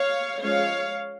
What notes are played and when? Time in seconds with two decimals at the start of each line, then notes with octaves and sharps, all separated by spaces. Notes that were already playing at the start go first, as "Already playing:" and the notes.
Already playing: C#5 F5
0.41 F3 G#3 C#4 C#5 F5